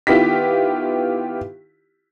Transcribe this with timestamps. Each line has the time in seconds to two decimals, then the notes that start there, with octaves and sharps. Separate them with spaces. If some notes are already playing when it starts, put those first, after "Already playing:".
0.07 D#3 B3 E4 F4 G4 B6